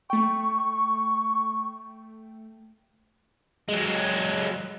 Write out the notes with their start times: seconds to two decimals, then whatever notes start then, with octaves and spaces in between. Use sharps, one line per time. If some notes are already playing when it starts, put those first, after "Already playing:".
0.10 A3 G5 C#6
3.69 F#3 G#3